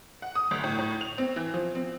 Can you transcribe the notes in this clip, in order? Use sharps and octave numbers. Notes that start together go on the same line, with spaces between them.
F#5
D#6
G1
A2
A2
F7
C4
E3
F3
C4